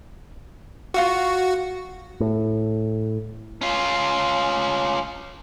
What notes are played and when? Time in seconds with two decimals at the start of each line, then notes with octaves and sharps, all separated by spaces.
0.94 F4 F#4 F5 C#6
2.20 A2
3.61 C#4 F4